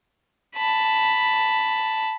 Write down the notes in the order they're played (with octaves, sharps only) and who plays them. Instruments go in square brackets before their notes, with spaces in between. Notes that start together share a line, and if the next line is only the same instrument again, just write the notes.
[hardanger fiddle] A5 B5